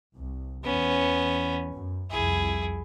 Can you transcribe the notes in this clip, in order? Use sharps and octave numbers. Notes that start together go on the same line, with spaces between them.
C2
E2 B3 C#4
F#2
C2 F2 E4 G#4